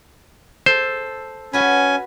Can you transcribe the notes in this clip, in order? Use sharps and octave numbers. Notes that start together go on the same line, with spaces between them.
A4 C5
C#4 F#4 B4 G#5